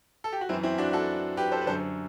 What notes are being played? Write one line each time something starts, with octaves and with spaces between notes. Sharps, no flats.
A4
G4
F#4
F#2 E3 C4 E4
C4 E4
D4 F#4
F#4 A4
G4 B4
A4 C5
B4
F#2 D3 A4 C5